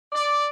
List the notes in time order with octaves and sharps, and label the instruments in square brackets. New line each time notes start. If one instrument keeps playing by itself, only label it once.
[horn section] D5